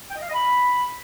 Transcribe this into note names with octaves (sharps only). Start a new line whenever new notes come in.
G5
D#5
F5
D#5
B5